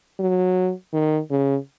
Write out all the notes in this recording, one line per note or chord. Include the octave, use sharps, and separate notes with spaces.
F#3
D#3
C#3